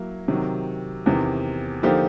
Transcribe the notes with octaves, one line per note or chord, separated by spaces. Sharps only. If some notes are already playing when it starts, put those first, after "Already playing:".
Already playing: F#3 A#3 E4
C3 D#3 F#3
E2 C3 D#3
D3 F3 A#3 D#4 G4